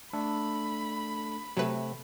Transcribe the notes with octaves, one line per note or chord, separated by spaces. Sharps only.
A3 D4 A4 B5
C3 F#3 A3 B4